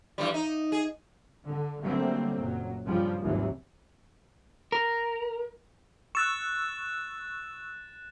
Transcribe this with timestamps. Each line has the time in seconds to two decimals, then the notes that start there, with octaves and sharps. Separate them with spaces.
0.18 E2 G2 G3
0.34 D#4
0.72 G#4
1.46 D3
1.81 D3 F#3 G3 A3 A#3 C4
2.37 F#1 A#2 F#3
2.86 G2 C#3 F3 G3
3.21 G#1 D#2 C3 E3 F#3
4.72 A#4
6.15 C#6 E6 F#6 A6 E7